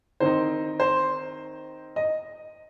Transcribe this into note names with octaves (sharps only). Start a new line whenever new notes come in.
D#3 C4 D#4 C5
C5
D#5